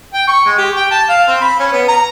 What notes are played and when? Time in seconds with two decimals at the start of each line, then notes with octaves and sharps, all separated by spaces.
0.14 G5
0.28 C#6
0.46 G#3
0.58 G4
0.76 G5
0.91 A5
1.09 F5
1.28 C4
1.41 B5
1.60 C#4
1.72 B3
1.88 A#5